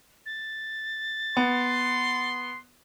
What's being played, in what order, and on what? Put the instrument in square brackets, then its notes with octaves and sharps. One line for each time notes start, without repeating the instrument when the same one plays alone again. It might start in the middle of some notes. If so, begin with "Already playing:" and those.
[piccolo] A6
[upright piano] B3 [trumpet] C6